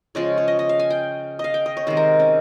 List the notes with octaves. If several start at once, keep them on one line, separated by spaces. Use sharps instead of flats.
C#3 F3 G#3 C#5
C#5
D#5
D#5
F5
G#5
G5
D#5 F5
G5
D#5
C#5
C3 D#3 G#3 C5
A#4
C#4